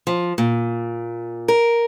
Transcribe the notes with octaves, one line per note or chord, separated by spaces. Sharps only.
F3
A#2
A#4